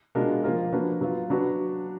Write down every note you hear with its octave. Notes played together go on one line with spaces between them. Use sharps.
B2 G#3 D4 F4 A#4
F3 A#3 F4 A#4
F3 A#3 D4 F#4 B4
F#3 B3 F4
F#3 D4 F#4 B4